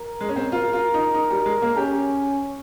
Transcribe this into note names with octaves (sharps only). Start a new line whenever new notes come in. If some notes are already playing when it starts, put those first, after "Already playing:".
Already playing: A#4
G#3
C#4
C4
F4 A#4
F4
D#4
D#4
G3
G#3
A#3
C#4 G4